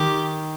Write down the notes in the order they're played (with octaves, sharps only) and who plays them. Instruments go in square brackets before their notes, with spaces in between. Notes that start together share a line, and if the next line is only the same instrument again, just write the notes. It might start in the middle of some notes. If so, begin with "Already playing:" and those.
Already playing: [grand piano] D#3 [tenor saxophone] G4